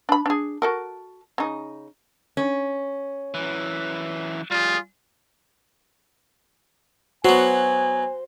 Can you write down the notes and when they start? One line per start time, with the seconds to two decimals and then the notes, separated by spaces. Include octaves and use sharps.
0.09 D4 B5
0.26 D4 G#4
0.62 F#4 A4 A#4
1.38 C#3 D#4
2.37 C#4
3.34 F#2 E3
4.51 G3 F4 G#4
7.25 F#3 B3 F#4 C5 G#5